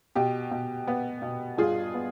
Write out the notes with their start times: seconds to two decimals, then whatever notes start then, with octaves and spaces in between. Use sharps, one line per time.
0.15 B2 G4
0.51 B2
0.87 B3
1.22 B2
1.58 G2 F4 G#4
1.94 B3